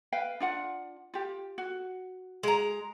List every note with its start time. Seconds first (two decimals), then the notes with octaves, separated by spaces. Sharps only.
0.12 B4 F5 G5
0.40 D4 F4 F#5
1.14 F4 G4
1.58 F#4
2.43 G#3 A#5